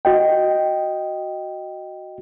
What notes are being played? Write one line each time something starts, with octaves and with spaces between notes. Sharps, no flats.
F#4 D#5 G5